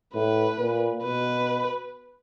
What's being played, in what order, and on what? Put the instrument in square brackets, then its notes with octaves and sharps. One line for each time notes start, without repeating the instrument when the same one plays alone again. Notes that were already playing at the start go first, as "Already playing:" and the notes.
[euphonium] A2 [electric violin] B4
[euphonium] A#2
[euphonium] B2 [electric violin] B4